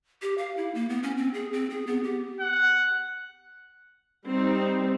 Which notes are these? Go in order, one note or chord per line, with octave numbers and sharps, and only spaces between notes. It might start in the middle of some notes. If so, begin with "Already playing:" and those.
G4
F5
E4
A#3
B3
C#4
C4
G#4
C4
G#4
B3
G4
F#5
G3 C4 D#4